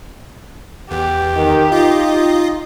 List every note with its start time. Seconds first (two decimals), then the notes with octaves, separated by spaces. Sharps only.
0.91 E2 G4
1.36 D#3
1.72 D#4 F4 D#5